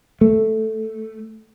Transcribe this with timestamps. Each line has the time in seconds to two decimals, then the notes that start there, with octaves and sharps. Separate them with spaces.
0.21 A3